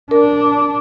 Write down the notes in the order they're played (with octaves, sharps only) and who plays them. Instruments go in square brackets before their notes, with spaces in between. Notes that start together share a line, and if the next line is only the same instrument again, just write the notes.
[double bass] D4 [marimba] A#4